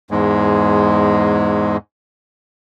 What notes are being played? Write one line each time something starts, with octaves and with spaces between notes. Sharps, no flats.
E2 G#2 G#3